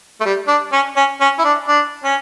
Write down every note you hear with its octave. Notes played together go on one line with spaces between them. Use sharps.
A3
G3
D4
C#4
C#4
C#4
E4
D4
D4
C#4